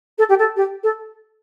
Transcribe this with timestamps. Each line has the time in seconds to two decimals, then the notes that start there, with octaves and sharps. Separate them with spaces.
0.18 A4
0.28 G4
0.38 A4
0.56 G4
0.83 A4